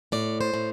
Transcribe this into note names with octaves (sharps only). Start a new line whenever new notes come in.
A2 D5
C5
A2